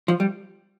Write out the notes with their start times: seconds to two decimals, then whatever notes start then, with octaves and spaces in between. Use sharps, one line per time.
0.08 F3
0.20 G3